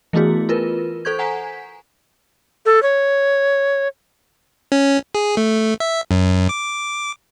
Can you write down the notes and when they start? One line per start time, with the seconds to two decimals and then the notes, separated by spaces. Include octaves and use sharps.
0.13 E3 A3 B3 E4 F#4 G#4
0.49 F4 A#4 B4
1.05 A4 C5 C#6 G6 G#6
1.19 F#5 G#5 A#5 B6
2.66 A4
2.83 C#5
4.72 C#4
5.15 G#4
5.37 A3
5.80 E5
6.11 F#2
6.49 D6